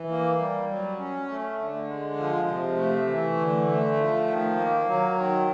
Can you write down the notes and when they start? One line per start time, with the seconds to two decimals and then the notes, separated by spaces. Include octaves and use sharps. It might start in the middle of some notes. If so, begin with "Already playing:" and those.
Already playing: E3
0.10 A#3
0.39 G3
0.69 F#3
0.98 C#4
1.28 A3
1.58 D3
1.88 G#3
2.17 F3
2.47 C3
2.77 A3
3.07 E3
3.37 D3
3.67 A3
3.96 F3
4.27 D#3
4.56 A#3
4.86 F#3
5.16 D#3